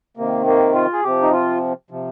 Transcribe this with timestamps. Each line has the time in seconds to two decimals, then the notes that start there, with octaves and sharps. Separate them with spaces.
0.17 C3 D#3 A#3
0.46 A#3
0.75 F4
0.93 G#4
1.03 C3 F3 G4
1.22 D#4
1.32 F4
1.90 C3 F3